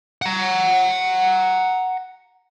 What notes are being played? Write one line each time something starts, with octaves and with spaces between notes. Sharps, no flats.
F#5 A#5